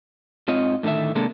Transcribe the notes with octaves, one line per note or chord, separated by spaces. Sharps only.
G#2 C4 F4 C#5 D#5
A2 D3 D#3 A3 E5
C3 G#3 A#3 D4 A4